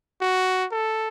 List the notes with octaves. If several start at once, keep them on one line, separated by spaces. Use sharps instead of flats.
F#4
A4